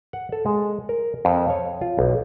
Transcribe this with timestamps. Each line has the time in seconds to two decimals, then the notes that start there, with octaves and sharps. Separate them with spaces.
0.13 F#5
0.32 A4
0.46 G#3
0.89 A#4
1.25 F2
1.50 C#5
1.81 F4
1.99 B1